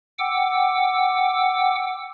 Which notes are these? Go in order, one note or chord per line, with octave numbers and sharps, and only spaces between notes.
F#5 G5 D6 E6